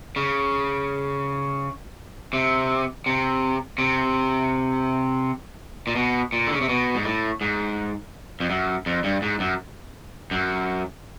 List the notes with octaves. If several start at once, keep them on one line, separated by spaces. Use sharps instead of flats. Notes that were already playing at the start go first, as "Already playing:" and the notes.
C#3
C3
C3
C3
A#2
B2
A#2
D3
C#3
C3
B2
G#2
A2
G#2
F2
F#2
F2
G2
G#2
F#2
F#2